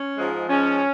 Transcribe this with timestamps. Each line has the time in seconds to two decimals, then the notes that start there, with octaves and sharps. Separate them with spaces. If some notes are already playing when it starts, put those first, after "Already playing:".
Already playing: C#4
0.17 G#2 F3 G#3
0.48 G#2 F3 G#3 C#4